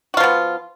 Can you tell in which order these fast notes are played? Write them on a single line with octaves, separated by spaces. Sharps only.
F#4 F4 F3 B3